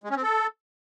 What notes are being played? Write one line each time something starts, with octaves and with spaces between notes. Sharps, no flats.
G#3
C#4
C4
A4